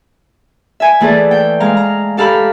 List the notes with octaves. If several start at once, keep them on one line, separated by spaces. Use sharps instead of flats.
E5 G#5
E3 A3 G#4 D5
G5
G#3 F5 A#5
A#5
G4 A4 F5 A#5 B5